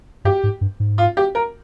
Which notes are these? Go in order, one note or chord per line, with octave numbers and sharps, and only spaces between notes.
G2 G4
G#2
G2
G#2
F4
G4
A#4